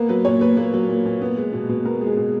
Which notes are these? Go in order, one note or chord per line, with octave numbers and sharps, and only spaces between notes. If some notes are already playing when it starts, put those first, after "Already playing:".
Already playing: A#3 B3 A#4
F#3 B4
A#2 C#5
A#2 B4
A#3 B4
F#3
A#2
A#2
B3
G#3
B2
B2
B3 A#4
G#3
G#4
B2